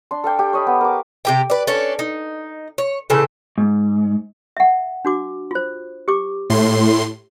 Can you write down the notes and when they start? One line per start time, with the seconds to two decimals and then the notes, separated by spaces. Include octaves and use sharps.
0.11 D4 C6
0.24 A4 F5 G5 D6
0.39 G4 G5
0.53 C#5 D#5 B5
0.67 B3
0.81 A#4 D6
1.25 C3 G4 G5
1.50 B4 D5
1.67 C#4 D4 A4
1.99 D#4
2.78 C#5
3.10 A#2 C#3 E3 A4
3.58 G#2
4.57 E5 F#5
5.05 D4 F#4 D6
5.51 F4 C5
6.08 G4 D6
6.50 A2 C6